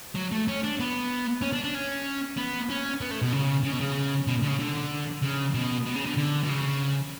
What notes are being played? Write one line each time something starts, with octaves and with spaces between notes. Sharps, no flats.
F#3
A3
C#4
D4
B3
C#4
D4
D4
C#4
B3
C#4
B3
A3
B2
C#3
C#3
B2
C#3
B2
D3
C#3
D3
C#3
B2
B2
C#3
D3
D3
B2
C#3